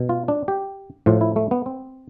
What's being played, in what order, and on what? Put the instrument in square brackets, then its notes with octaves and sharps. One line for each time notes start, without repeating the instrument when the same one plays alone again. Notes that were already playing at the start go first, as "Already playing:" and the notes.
Already playing: [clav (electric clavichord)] B2
F4
D4
G4
A2 F3 F4
E4
A3
B3
C4